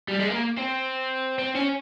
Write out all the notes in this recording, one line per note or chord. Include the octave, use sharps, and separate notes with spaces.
G3
G#3
A#3
C4
C4
C#4